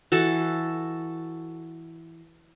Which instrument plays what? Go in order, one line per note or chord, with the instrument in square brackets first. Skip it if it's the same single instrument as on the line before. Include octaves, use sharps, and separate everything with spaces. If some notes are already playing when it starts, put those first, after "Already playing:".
[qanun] E3 F#4 A4 A5